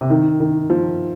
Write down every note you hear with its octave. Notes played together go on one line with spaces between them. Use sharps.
C3
D#3
D#3
F3